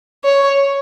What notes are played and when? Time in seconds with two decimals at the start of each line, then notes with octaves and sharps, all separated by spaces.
0.24 C#5